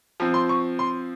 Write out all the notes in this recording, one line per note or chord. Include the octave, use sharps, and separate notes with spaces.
F3 C4
C6
C#6
C6